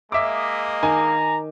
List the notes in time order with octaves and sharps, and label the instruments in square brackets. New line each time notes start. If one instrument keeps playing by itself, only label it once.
[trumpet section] G#3 A#3 D#5 [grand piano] E5 D6
[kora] D#3 [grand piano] G#5 [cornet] A#5